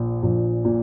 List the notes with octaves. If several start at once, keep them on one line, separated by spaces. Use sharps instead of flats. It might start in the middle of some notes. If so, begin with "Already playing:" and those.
Already playing: A#1 A#2
A#1
A#2